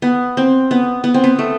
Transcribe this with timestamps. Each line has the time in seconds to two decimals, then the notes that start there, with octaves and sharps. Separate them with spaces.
0.02 B3
0.37 C4
0.71 B3
1.04 B3
1.14 C4
1.24 B3
1.39 A3